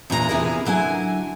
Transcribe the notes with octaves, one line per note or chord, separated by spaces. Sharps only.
E2 A#2 D4 G#4 A#5
C3 E3 B3 E4 G#4 A#4
D3 F#3 E4 F5 G#5